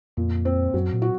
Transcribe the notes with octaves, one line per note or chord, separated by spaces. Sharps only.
F2 A#2
C4
F#2 F#3
A#2
F#4